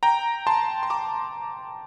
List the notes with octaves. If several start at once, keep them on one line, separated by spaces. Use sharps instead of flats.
G5 A#5
A5 C6
C6
A#5 D6